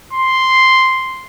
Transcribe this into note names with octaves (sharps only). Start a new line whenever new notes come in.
C6